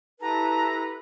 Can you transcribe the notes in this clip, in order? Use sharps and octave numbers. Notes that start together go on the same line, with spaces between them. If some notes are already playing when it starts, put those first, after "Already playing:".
E4 G4 A4 B4 A5 A#5